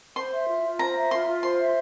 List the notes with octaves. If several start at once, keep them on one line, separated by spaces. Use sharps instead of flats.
C5 C6
E5
F4
F4
C5 A#5
E5
F4 C6
F4
C5 C6
E5